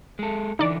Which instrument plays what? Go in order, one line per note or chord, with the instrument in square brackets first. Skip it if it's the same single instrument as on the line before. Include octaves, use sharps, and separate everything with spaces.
[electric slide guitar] G#3 A4
[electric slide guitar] D3 E3 [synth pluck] D#4 D5